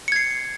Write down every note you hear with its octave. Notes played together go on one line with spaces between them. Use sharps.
G#6 C7 C#7